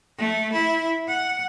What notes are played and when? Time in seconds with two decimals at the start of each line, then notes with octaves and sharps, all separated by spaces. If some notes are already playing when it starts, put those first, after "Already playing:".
0.17 A3
0.52 E4
1.07 F#5